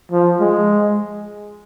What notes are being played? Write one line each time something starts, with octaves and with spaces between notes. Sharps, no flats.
F3
G#3